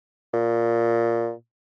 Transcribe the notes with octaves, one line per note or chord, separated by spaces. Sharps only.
A#2